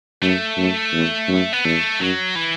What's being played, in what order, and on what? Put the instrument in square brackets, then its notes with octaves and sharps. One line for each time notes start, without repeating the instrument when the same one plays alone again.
[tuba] F#2 [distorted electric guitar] A3
[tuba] F#2
E2
F#2
[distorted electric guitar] B3
[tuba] E2 [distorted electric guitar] A3
[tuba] F#2 [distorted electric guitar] F#3
[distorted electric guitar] E3